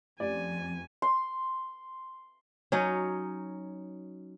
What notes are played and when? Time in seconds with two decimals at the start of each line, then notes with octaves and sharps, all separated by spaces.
0.20 F2 A3 C#4 G4 D5 G#5
1.02 C6
2.72 F#3 C#4 D#4